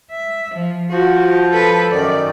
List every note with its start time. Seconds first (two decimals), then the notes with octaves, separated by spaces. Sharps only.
0.11 E5
0.55 F3
0.90 F3 F#4
1.52 A4 B4
1.91 F#2 D#3 D5